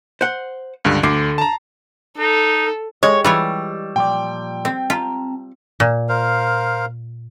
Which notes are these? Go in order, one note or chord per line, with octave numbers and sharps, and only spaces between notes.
C5 F#5
C#2 G2 D3
D2 D3 D6 C7
A5 A#5
D#4 A4
G#3 G4 C#5 D#5
E3 G3 F4 C#5 E6
A#2 F3 D5 G5
C4
C4 F4 A5 A#5
A#2
A#4 C5 F5